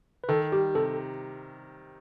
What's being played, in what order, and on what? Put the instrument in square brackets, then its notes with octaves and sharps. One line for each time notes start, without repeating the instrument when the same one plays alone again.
[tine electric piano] B4
[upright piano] D#3 [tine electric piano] A4
[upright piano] G3 [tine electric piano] G4
[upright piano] C3 [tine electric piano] A4